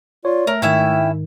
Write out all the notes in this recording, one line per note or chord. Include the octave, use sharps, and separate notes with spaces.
F4 C#5 D5
A3 A#4
G#2 D#3 C#4 E4 E5 G5